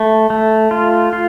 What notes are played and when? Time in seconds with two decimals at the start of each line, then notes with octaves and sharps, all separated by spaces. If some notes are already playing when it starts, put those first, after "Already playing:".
Already playing: A3
0.30 A3
0.71 F4
1.13 F4